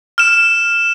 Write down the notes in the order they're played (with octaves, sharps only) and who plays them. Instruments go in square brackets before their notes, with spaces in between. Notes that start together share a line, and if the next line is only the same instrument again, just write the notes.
[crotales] F6 E7